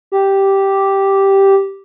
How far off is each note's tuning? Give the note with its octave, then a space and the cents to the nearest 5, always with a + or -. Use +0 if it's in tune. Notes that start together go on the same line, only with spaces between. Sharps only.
G4 -5